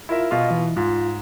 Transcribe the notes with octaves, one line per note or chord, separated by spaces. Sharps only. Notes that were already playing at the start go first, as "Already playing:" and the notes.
E4 F4 A#4 E5
B2 F4 D#5
E3
G#2 F4